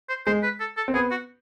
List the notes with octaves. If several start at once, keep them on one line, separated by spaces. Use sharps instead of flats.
C5
G#3 C5
B4
A4
A4
C4
B3 G#4
F#4